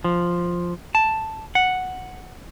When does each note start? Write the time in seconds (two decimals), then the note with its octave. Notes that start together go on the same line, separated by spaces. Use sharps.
0.04 F3
0.95 A5
1.55 F#5